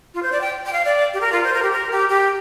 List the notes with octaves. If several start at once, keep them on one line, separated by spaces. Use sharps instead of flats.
F4
C5
D5
G5
G5
F5
D5
G4
A#4
F4
C5
A#4
G4
A#4
G4
G4